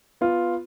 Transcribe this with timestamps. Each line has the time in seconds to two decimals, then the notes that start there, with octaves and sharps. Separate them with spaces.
0.21 B3 F4